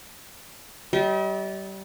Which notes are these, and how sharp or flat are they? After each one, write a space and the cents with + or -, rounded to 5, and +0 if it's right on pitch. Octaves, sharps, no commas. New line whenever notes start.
G3 -25 D#5 +45